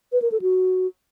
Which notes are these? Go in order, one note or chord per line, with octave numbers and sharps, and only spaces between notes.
B4
A#4
A4
F#4